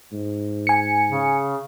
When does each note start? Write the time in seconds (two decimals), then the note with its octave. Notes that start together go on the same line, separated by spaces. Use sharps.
0.12 G#2
0.67 G#5 C#7
1.10 C#3